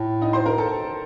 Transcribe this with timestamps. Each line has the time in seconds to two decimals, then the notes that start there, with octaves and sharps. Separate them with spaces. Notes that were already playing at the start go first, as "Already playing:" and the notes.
Already playing: A2
0.22 D#4 D#5
0.33 C5 C6
0.46 A#4 A#5
0.58 A4 A5